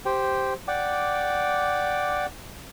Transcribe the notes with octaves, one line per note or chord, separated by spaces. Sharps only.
G4 C5 G5
D5 F#5 G5 D6